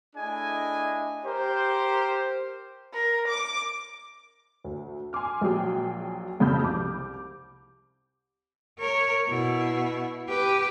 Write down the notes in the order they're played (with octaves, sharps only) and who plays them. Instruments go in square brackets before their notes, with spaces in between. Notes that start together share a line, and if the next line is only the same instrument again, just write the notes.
[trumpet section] A3 D4 E4 G#4 D#5 G#5
G4 A#4 C5
[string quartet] A#4
D6
[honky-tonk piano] D2
G#5 C6 D6 F6
A#1 F#3 G#4 G5
B1 F2 C#3 B5 G6
C2 D6
[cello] A#4 C#5
B2 E4
G4 B4